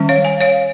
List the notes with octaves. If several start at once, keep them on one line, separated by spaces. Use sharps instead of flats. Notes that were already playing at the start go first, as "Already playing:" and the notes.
Already playing: D#3 G3 C#4
C#5 F5
F5 G#5
C#5 F5